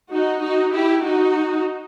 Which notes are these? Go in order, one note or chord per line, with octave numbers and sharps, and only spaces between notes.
D#4 F#4
D#4 F#4
E4 G4
D#4 F#4